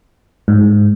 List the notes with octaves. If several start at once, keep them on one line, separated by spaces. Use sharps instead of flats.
G#2